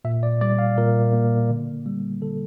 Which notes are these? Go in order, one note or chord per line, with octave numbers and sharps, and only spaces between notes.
A#2 E5
D5
G3 D5
F5
A#2 A#4
A#3
D3
G3
D3 A4